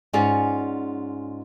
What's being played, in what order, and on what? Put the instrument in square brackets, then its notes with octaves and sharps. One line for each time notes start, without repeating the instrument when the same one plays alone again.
[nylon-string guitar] G#2 C#4 F4 G#4 D5 F#5